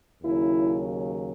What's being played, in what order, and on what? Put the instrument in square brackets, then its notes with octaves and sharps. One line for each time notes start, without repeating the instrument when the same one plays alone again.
[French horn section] D#2 C#3 F#3 E4